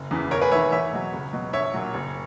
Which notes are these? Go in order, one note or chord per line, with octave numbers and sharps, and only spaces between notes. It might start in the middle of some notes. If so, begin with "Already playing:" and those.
Already playing: F#1
E2 C#3 E3
E1 A#4 C#5
G#4 B4
E2 D#3 C#5 E5
E2 C#5 E5
B2 F#3
C#2
B2 F#3
A#1 C#5 E5
A#2 F#3
F#1